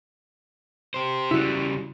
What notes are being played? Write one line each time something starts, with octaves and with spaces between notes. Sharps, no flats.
G4 C5
C#3 G3 E4 F#4